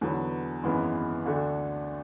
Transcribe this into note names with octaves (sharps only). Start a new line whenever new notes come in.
E2 D3 F#3 B3
G#1 F#2 E3 G#3 B3
D2 D3 A3 D4 F#4